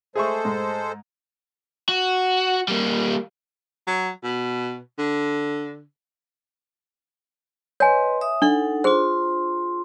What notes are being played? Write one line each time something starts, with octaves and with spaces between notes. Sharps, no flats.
G#3 G#4 A4 C5 E5 C#6
G#2
F#4
G3 A#3
F#3
B2
D3
B4 C#5 D#5 G#5 C6
E5 D#6
D4 D#4 A4 F#5
F4 G#4 C5 C6